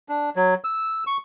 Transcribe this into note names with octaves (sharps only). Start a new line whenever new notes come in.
D4
F#3
E6
C#6